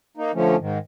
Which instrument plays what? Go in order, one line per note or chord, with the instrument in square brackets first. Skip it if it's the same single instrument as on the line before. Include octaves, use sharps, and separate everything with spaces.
[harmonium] A#3 D#4
D3 F3 A3 C#4
G#2 D#3